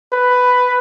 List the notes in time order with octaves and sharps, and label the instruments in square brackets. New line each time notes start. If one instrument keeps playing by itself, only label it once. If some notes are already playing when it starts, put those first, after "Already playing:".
[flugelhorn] B4